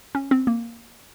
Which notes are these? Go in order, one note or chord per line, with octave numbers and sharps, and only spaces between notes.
C#4
C4
A#3